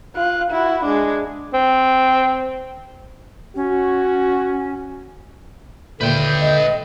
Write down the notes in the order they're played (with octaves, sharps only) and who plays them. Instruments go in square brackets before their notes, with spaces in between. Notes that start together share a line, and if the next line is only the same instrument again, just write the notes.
[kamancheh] F4 F#6
E4 F#4
G#3 D4
[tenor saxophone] C4
[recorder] C#4 [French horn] F#4
[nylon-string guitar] D#2 A#2 [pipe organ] D3 E5 G6 [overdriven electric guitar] B4 G5
[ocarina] D#5